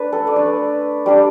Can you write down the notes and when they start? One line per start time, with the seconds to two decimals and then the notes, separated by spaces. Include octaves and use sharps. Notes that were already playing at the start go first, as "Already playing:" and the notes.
Already playing: A3 D4 B4 D5
0.13 A4
0.27 D5
0.36 A3 D4 B4
1.06 G3 D4 D5